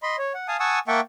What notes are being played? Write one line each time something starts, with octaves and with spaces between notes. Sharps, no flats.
D#5 B5 C6
C#5
F#5
F5 G#5 A5 D#6
F#5 G#5 A5 C#6 D#6 E6
A#3 E5 F#5 G5 A5 C#6